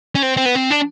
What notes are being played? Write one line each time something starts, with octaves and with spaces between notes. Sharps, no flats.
C#4
C4
C4
B3
C4
D4